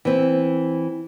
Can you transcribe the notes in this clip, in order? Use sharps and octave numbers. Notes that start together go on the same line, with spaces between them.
E3 C4